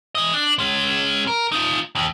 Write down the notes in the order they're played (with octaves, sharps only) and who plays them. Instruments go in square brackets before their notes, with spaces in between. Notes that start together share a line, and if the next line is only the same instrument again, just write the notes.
[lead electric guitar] E3 D#5
D4
G#3 C#4
A#4
D#4 F4
D#2